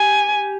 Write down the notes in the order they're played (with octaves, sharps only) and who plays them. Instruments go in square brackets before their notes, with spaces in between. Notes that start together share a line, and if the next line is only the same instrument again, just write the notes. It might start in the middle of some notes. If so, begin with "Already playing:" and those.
Already playing: [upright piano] G4 [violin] G#5